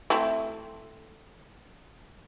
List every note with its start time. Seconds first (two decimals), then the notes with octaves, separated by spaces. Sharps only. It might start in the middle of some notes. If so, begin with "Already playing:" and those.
0.10 A3 C4 E4